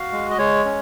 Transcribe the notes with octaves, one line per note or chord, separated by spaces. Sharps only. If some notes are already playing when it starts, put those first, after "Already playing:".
Already playing: F#4 F5
G#3
D#5
G#3 C#5
C#4